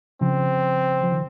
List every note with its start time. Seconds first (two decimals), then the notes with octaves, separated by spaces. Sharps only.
0.21 C#3 F3 C4
1.03 F3
1.12 D#3